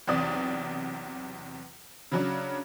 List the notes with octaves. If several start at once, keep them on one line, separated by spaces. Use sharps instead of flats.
B1 E2 C3 D5 D#6
C#3 F#3 D4